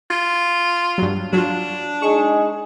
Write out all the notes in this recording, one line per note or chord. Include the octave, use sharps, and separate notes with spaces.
F4
G2 F#3
F#3 D4 F4
G#3 D#4 G#4 C#6